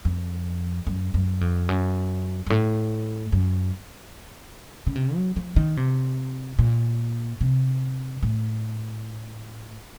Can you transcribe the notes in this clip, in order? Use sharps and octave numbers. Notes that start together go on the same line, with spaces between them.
F2
F#2
F#2
F2
F#2
F#2
A2
F#2
C#3
C3
F#3
F3
D#3
C3
A#2
C3
A2